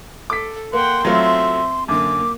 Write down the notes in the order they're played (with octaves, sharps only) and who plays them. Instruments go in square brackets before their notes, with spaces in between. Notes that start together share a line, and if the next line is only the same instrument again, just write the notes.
[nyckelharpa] A4 [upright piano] D6 B6
[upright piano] A#3 [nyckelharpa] F#5 G5 [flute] C6
[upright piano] F#3 A3 F4 [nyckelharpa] C4 E5
[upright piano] F#2 D3 [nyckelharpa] A#3 [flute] D6